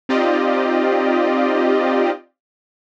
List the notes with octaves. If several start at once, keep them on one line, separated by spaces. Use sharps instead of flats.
C4 D#4 F4 G4 D5 D#5